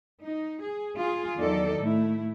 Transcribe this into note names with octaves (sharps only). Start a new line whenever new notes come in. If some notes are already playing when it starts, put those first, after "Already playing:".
D#4
G#4
F4 G#4
E2 D#3 F#3 D#4 A4 D5
A2 A3 E4